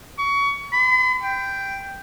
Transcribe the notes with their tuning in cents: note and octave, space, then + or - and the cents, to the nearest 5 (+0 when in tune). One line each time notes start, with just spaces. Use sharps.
C#6 +25
B5 +45
G5 +0